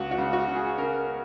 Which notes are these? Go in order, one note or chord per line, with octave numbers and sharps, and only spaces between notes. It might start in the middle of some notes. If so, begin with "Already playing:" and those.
Already playing: C#2 F#4
F#4
C#3
F#4
C#3
G#4
C#3 A#4